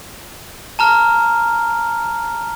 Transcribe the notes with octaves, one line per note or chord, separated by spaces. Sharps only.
A5 A#5 F6